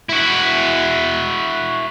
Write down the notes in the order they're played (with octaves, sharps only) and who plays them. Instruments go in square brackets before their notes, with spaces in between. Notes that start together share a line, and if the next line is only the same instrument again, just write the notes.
[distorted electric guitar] E4 F#4